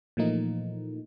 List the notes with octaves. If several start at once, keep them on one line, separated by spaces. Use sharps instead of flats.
A#2 E3 F3 A3 A#3 D#4